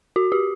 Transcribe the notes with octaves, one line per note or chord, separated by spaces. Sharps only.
F#4
G4